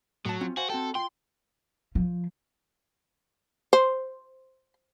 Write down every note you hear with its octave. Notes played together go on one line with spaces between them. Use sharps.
A2 F#3 A5
C4 C#4 F4
F#4 C5 F5 G#5
C4 F#4 A4 G5
F4 G5 C6
F3
C5